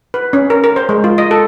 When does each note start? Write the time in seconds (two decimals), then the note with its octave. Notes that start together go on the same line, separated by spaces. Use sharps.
0.14 B4
0.33 C#4
0.50 A#4
0.64 A#4
0.76 C5
0.89 G#3
1.04 F4
1.18 D#5
1.31 A4